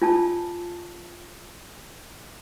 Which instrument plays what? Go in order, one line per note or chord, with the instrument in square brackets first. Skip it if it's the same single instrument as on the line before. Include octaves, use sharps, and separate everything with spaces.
[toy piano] F4 G#5 A5